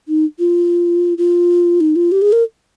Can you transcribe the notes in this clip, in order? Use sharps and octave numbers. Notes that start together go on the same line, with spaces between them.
D#4
F4
F4
D#4
F4
G4
G#4
A#4